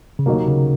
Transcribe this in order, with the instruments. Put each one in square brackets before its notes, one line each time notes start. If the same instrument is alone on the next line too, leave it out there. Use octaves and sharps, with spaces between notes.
[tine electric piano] C#3
[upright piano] D#2 D#3 F#3 A#3 [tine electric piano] C3
[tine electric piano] C#3